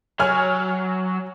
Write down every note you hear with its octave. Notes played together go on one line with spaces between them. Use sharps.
F#3 C#5 G#5 F6